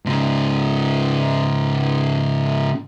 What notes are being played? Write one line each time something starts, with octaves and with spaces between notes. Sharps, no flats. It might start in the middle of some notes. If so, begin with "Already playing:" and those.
G#2 C#3